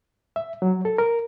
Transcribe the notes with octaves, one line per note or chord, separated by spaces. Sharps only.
E5
F#3
A4
A#4